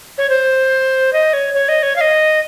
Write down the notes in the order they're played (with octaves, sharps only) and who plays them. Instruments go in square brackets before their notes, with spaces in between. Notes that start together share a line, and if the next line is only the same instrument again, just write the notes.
[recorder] C#5
C5
D#5
C#5
C#5
D#5
C#5
F5
D#5